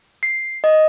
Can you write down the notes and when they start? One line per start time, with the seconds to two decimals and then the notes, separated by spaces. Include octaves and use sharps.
0.23 C7
0.64 D#5